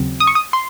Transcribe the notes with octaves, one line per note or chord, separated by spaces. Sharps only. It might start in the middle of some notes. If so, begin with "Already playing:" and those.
Already playing: D#2 C#3 F#3 C4
D#6
C#6
D#6
C6